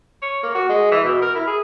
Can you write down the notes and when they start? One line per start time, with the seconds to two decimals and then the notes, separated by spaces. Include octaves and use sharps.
0.22 C#5
0.43 A#3
0.54 F#4
0.69 G#3
0.91 E3
1.03 B2
1.22 A#4
1.35 E4
1.47 G#4